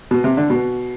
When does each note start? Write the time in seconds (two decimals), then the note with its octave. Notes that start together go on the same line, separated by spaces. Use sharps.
0.11 B2
0.24 C3
0.37 D3
0.50 B2